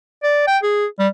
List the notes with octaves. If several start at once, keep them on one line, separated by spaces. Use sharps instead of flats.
D5
G5
G#4
G3